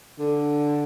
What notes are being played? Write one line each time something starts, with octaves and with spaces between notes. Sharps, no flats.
D3